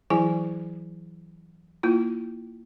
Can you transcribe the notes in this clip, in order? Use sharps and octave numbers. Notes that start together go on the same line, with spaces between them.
E3 F#3 E4 G#4 G#5
A#3 E4 F4